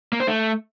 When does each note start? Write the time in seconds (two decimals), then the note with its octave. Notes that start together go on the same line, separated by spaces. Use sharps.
0.13 A#3
0.20 C5
0.27 A3